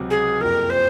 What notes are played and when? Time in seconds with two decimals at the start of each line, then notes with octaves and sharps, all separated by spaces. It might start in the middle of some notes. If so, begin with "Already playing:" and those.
Already playing: C#2 C3 F#3 C4 F#4
0.10 G#4
0.40 F#1 F2 C3 F3 A#4
0.70 C5